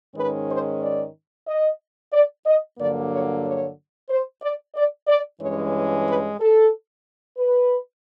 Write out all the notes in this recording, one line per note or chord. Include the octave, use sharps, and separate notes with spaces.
G#2 D#3 G#3 C#4 B4
C5
D5
D#5
D5
D#5
G2 D3 F#3 A#3 D5
C#5
C#5
C5
D5
D5
D5
G2 E3 G#3 C#4 C#5
B4
A4
B4